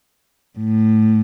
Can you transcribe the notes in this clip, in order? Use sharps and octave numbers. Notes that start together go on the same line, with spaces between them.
A2